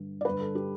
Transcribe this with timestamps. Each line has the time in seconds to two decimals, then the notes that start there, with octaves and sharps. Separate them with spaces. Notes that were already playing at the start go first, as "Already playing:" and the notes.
Already playing: G2 D3
0.21 D5
0.25 G2 D3 B4
0.40 A4
0.55 G4